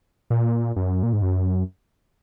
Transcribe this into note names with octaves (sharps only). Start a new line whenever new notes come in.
A#2
F#2
A#2
G#2
F#2